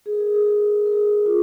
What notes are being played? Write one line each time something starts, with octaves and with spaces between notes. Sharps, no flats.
G#4
A#4
G#4
A#4
G#4
A#4
A#4
G#4
F4